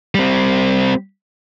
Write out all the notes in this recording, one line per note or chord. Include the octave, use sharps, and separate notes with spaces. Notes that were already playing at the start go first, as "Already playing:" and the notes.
G3 C4